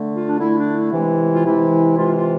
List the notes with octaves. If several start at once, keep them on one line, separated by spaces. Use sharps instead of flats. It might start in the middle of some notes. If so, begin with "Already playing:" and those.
Already playing: D3 A3
F4
D4
D3 A3 E4
D4
E4
C3 E3 G#3
F4
C3 E3 G#3 E4
C3 E3 G#3 F4
F4